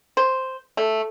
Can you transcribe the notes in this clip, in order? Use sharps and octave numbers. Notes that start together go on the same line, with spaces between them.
C5
A3